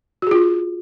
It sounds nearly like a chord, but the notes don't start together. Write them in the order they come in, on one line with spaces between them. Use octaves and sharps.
F#4 G#4 F4